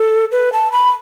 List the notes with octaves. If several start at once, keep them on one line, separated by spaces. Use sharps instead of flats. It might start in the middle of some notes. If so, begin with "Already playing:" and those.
Already playing: A4
B4
A5
B5